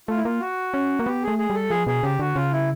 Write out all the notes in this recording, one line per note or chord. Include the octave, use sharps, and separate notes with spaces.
A3 F4
E4
A#3 F4
F#4
C#4
A#3
B3 G4
G#4
A3
G#4
G3 A4
F3 G#4
B2 G#4
C#3 G4
D3 F#4
C#3 F4
E4